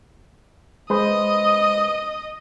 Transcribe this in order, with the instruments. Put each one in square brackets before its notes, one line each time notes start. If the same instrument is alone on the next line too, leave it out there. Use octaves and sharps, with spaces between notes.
[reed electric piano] G#3 B4 C5 [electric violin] D#5 D#6